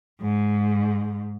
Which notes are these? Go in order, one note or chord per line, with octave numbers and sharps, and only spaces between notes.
G#2